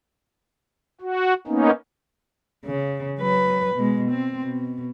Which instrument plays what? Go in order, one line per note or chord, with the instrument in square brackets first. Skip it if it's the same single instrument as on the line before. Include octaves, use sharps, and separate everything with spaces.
[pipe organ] F#4
A#3 B3 C#4 D#4
[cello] C#3
F#3 B4
B2 G#3
C4
B2